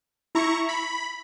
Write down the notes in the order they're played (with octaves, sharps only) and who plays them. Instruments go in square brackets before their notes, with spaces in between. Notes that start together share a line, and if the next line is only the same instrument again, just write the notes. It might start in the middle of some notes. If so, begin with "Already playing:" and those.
[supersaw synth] E4 A#5 C#6
B5